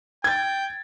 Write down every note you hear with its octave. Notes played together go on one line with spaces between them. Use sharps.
G5 G#6 A6